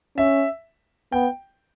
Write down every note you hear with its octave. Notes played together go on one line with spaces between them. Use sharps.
C#4 E5
B3 G5